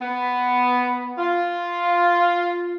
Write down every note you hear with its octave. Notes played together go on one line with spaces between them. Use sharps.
B3
F4